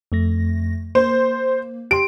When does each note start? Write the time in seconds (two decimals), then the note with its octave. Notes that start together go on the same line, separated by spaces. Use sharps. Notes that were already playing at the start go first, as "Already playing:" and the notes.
0.12 F2 A3 A#6
0.95 A#3 C5
1.91 G4 C6 D7